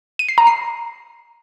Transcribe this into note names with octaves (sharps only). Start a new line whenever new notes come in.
D#7
C7
A#5
C7